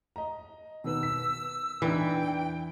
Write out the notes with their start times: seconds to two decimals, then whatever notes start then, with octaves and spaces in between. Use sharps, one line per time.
0.16 D#5 A#5
0.84 B2 D#3 B4 E6
1.03 B6
1.82 E2 E3 D4 D#4 G5